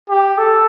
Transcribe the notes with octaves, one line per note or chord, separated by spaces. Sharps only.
G4
A4